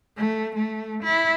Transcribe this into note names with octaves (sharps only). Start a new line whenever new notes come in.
A3
A3
E4